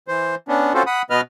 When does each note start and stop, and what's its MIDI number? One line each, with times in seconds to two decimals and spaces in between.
0.08 0.35 52
0.08 0.35 72
0.48 0.73 59
0.48 0.73 61
0.48 0.73 62
0.74 0.83 60
0.74 0.83 61
0.74 0.83 65
0.74 0.83 66
0.74 0.83 69
0.74 0.83 72
0.87 1.02 78
0.87 1.02 83
0.87 1.02 87
1.10 1.21 47
1.10 1.21 59
1.10 1.21 71
1.10 1.21 75
1.10 1.21 89